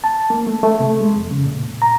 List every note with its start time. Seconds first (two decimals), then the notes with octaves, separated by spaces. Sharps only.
0.04 A5
0.30 A#3
0.47 A3
0.63 A3
0.80 C3
1.01 G#3
1.16 F2
1.31 C#3
1.45 A#2
1.82 A#5